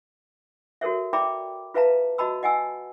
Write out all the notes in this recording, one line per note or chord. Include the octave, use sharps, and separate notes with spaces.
F#4 A4 A#4 C#5 E5
D5 E5 G5 A#5 B5 D6
F4 B4 E5 F5 A5 A#5
F#4 D#5 A5 B5 E6
D#5 F#5 G#5 E6